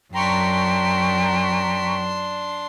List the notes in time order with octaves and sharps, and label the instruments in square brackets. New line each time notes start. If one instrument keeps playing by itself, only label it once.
[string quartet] F#2 [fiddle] D4 C6 [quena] G5 [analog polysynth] A#5 C#6 B6